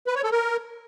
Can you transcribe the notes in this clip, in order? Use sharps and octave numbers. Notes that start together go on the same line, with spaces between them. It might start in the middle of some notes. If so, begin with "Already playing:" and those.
B4
C#5
A4
A#4